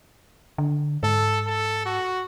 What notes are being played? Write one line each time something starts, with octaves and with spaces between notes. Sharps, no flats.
D3
G#2 A4
A4
F#4